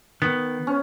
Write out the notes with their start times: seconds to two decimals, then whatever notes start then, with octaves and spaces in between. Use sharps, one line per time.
0.22 D#3 B3
0.67 C#4